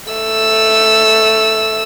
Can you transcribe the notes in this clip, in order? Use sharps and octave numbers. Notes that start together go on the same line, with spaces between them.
A3 E6